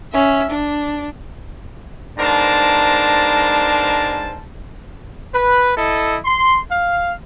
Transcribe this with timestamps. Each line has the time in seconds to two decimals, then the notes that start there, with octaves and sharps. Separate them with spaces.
0.13 C#4 E5
0.50 D4
2.18 G#2 B3 D4 A#4 C5 A5
5.34 B4
5.77 E4 A4 D#5
6.25 C6
6.71 F5